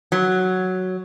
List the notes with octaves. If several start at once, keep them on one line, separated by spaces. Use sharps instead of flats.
F#3